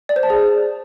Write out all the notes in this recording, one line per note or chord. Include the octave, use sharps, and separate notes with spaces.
D5
C5
A5
G#4